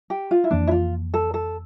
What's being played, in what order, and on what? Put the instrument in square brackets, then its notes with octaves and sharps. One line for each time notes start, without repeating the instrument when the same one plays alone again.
[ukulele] G4
F4
E4
[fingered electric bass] F2 E3 A#3 [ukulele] D4
[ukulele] E4
F4
A4
A4